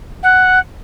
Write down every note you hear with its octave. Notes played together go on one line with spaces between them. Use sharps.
F#5